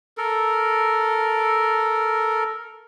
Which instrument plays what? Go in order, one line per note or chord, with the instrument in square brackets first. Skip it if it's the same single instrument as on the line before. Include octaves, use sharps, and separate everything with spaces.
[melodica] A4 A#4